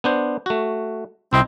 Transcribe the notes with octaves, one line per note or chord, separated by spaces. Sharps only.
B3 D4 C5
A3 F#4
C2 C4 E4 D#5